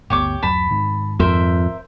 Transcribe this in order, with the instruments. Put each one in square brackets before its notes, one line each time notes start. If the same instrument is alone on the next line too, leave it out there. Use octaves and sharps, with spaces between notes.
[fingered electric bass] G1 D2 B3 [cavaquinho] G4 C#5 D6
[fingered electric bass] D1 F#2 F#3 [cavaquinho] A5 B5
[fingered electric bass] G#2 D#3
[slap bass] F2 [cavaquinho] A#4 C5 E5